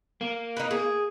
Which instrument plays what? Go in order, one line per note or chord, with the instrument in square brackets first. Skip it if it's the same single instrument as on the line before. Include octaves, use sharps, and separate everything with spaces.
[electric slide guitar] A#3
[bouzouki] D#4 B4
G#4